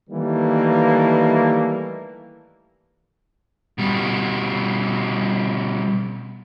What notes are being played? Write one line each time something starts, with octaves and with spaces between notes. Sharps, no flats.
D#3 E3 G3 A3 A#3
B2 G3